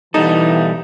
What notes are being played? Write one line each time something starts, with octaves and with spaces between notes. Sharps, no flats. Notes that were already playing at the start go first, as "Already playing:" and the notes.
B2 E3 G3 D#4 A4